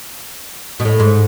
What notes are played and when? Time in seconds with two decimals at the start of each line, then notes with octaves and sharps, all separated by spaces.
0.80 B2
0.85 A2
1.00 G#2